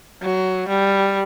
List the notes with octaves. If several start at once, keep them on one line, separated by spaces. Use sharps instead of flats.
F#3
G3